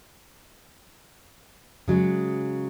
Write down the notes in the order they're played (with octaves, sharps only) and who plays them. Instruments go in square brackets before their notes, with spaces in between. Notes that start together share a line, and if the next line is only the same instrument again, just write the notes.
[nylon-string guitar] C#3 F#3 G#3